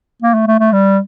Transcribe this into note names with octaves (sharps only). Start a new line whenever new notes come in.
A#3
A3
A3
A3
G3